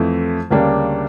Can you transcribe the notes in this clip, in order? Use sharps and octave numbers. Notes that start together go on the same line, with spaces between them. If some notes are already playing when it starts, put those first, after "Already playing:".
Already playing: F2 E3 A3 E4
D2 C#3 G3 A#3 D4